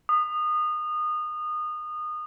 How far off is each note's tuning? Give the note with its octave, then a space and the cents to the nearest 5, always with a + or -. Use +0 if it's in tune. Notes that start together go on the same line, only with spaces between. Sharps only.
D#6 -25